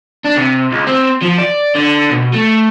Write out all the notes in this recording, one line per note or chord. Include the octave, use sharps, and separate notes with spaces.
D4
C3
C#2
C4
F3
D5
D3
B2
A3